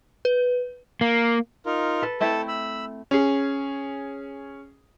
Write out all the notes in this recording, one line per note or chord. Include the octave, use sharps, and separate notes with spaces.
B4
A#3
D#4 F4 A#4
A4 B4
A3 C4 E4 A4 A5
B5 E6
C#4 G#4